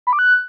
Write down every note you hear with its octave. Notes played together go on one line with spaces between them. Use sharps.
B5
D6
F#6